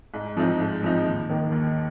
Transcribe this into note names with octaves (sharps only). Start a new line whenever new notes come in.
G#2
F3 G#3 C4 D#4
G#2
F3 G#3 C4 D#4
D#2
D#3 A#3
D#2